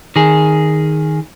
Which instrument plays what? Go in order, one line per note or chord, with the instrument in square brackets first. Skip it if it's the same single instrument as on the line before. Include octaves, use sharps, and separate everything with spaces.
[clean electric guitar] D#3 G#4